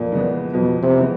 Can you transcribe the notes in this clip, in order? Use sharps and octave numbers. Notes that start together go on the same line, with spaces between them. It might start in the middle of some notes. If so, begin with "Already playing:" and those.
Already playing: F2 A#2
C#3 E3 G#3 B3
F2 B2
C3
C#3 E3 G#3 B3